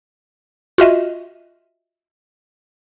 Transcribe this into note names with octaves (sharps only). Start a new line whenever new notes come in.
F4 F#4 D#5 E5